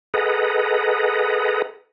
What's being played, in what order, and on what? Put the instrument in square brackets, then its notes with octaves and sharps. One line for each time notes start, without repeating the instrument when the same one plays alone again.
[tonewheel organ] G#4 A4 B4 D#5 F#5 A#5